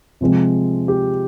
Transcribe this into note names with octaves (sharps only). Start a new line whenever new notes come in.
C3 F3 G#3 C4
G4